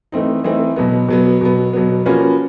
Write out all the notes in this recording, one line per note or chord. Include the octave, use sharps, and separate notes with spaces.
E3 A3 C4 D#4
E3 A3 C4 D#4
B2 F#3 B3
B2 F#3 B3
B2 F#3 B3
B2 F#3 B3
F3 A#3 C#4 F#4 B4